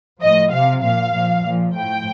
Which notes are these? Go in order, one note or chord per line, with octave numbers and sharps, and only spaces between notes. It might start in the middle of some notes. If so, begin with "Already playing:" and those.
A2 F3 D#5
C3 F3 F5
A#2 F3 F5
A#2 F3
A#2 F3
A2 F3 G5